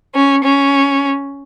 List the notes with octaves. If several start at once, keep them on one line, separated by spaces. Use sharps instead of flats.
C#4
C#4